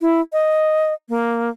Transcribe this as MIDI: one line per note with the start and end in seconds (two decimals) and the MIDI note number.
0.01 0.21 64
0.33 0.94 75
1.09 1.50 58